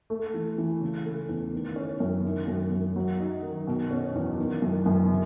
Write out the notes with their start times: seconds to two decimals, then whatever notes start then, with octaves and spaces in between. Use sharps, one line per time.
0.10 A3
0.34 E3
0.58 E3
0.81 C#3
1.05 A3
1.29 E2
1.53 D#3
1.76 C#4
2.00 F#2
2.25 D#3
2.48 F#2
2.72 F#2
2.96 F#3
3.20 D#4
3.43 D#3
3.67 B2
3.91 C#4
4.15 E2
4.38 D#3
4.62 F#2
4.86 F#2
5.10 C#3